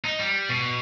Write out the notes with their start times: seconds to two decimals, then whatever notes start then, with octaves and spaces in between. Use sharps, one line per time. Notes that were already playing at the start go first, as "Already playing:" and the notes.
0.04 D#4
0.19 G3
0.49 B2